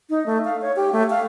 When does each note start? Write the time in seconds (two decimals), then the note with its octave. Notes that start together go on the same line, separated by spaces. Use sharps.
0.10 D#4
0.26 A3
0.45 F5
0.62 C#5
0.76 G4
0.92 A3
1.10 F5